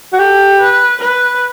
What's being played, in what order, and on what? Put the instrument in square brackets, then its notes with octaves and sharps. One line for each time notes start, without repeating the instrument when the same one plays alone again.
[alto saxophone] F#4
[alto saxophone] G4 [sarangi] A4
[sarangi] B4
B4